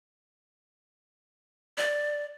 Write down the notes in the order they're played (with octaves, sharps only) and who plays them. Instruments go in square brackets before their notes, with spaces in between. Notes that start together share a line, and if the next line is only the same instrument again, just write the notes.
[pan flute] D5